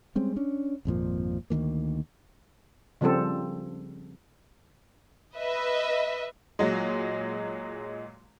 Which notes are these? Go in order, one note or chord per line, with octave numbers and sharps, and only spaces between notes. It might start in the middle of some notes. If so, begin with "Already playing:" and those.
G3 G#3 C4 C#4
C#4 D4
G#1 F2 A#2 F3
D2 D#3 E3 A#3
C#3 F3 G3 C4 A4
B4 D#5 E5
A#2 F#3 G#3